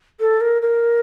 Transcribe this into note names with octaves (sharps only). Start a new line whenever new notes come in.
A4
A#4
A#4